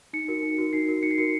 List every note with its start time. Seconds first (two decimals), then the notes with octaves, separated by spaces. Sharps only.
0.13 D#4 C#7
0.28 F#4 A#4
0.43 D#4
0.58 F#4 A#4
0.73 D#4 C7
0.89 F#4 A#4
1.03 D#4 C#7
1.11 C7
1.18 F#4 A#4 C#7